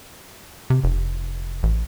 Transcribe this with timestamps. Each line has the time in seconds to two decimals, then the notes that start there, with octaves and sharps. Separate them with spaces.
0.70 C3
0.84 F1
1.63 A1